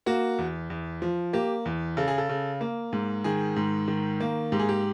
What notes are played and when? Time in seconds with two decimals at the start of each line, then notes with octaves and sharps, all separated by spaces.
0.06 A#3 F#4
0.38 E2
0.70 E2
1.02 F3
1.33 A#3 G4
1.66 E2
1.97 C#3 A4
2.08 G#4
2.18 A4
2.29 C#3
2.61 A#3
2.93 G#2
3.24 D#3 G#4
3.56 G#2
3.88 D#3
4.20 A#3
4.52 G#2 G4
4.59 G#4
4.69 G4